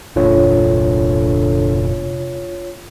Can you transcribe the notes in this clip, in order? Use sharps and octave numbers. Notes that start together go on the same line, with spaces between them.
F1 A#2 D3 F4 C#5